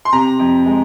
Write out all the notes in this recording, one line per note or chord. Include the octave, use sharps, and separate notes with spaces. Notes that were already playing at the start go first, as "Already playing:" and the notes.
C6
C3 A#5
F2
G#3